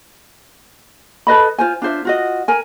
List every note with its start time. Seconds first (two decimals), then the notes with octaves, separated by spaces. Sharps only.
1.27 A4 B4 D#5 B5
1.58 F4 C5 G#5
1.82 D4 F4 C5 E5
2.05 F4 F#4 D#5
2.48 A#4 G#5